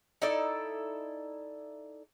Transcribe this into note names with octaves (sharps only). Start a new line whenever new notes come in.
D#4 E4 A4 D5